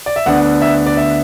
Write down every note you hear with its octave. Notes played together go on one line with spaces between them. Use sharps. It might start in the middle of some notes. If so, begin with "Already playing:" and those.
D5
E5
D2 D3 B3 D4 F#5
E5
D5
E5